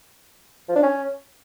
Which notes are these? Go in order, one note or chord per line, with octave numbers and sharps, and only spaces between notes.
F3
D4
C#4